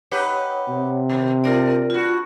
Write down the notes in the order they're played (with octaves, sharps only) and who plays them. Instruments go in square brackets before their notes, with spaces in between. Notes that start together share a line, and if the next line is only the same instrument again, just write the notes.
[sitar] D#4 G4 B4 [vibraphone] C#5 F#5
[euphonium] C3
[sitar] A#2 D#3
[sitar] A3 D4 [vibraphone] F4 A#4 D5
[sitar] G2 F#4 [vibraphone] F4